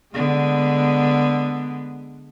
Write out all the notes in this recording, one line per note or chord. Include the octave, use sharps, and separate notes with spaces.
D3 G#3 B3